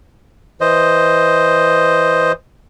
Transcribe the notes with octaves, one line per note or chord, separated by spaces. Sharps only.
E3 C5 D#5